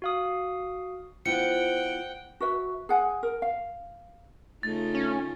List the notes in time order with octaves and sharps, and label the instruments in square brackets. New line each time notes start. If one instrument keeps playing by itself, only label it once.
[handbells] F#4 F5 D#6
[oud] F3 [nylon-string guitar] B3 E4 F4 [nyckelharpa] F#5 G5 [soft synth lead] C#7
[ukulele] F#4 B4 E5
G#4 F#5 G#5
A#4
F5
[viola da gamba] C#3 D#4 F4 [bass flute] A3 [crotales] A6
[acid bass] C#4